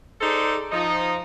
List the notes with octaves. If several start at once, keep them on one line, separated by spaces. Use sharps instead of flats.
D#4 G#4 A4 C5 D5
F3 D#4